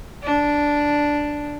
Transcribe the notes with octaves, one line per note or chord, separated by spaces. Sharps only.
D4